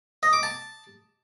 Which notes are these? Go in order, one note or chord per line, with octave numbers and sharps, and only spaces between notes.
D#5
D6
A5